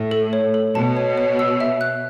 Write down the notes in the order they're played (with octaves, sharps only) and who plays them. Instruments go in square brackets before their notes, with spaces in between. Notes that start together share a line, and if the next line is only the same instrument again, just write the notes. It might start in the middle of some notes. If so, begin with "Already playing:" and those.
Already playing: [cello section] A2
[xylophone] A4
C#5
A4
[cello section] B2 [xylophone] A5
[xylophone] C#5
C#5
E6
E5
F#6